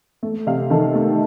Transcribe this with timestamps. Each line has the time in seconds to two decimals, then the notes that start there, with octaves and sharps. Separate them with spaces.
0.23 A3
0.47 C3 F5
0.70 D#3 A4
0.95 A3